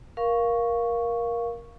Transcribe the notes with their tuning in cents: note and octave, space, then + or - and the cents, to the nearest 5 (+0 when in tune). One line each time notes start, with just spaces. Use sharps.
A#4 +15 F5 +0 C#6 +0